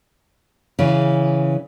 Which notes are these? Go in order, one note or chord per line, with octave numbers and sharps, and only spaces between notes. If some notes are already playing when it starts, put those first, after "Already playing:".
C#3 E3